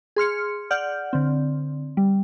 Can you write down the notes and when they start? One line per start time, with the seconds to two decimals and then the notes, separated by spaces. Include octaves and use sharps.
0.16 G#4 C6 F6 C#7
0.71 D5 F#5 F6 G6
1.13 D3 C4
1.97 G3